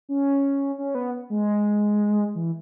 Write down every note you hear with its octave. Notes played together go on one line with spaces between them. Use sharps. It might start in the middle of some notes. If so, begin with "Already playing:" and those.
C#4
C#4
B3
G#3
E3